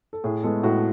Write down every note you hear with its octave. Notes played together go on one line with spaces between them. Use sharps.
A4
A2 G#4
G#3 B3 A4
A2 F#4